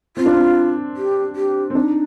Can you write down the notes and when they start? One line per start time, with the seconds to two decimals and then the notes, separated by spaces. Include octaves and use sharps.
0.17 C4 F4
0.26 D4
0.34 C4
0.97 G4
1.36 G4
1.70 C4
1.75 D4 D#4